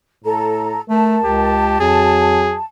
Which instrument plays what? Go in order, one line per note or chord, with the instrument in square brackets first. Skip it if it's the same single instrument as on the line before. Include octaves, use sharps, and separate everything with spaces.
[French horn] A2 [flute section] A4 A#5
[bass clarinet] A3 [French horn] A#4 [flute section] A5
[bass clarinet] C#2 [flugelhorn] G4
[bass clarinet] F2 [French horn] F#3 [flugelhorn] G#4